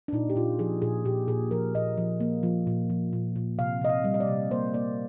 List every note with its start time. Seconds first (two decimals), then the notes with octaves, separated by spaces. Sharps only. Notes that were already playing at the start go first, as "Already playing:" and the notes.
0.08 D4
0.13 A#2 D#4
0.30 G4
0.36 A#2 F4
0.59 F3 G#4
0.82 A#2 G#4
1.05 A#2 G4
1.28 A#2 G#4
1.51 F3 A#4
1.74 A#2 D#5
1.98 F3
2.20 A#3
2.43 F3
2.67 A#2
2.90 F3
3.13 A#2
3.36 A#2
3.59 C3 F5
3.82 C3 D#5
3.89 F5
4.04 G3
4.14 D#5
4.20 D5
4.27 C3
4.51 A#3 C5
4.74 A#3 D5